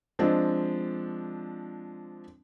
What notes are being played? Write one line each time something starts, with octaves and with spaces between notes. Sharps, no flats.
F3 G#3 C4 D4